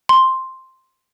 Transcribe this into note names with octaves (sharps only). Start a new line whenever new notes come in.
C6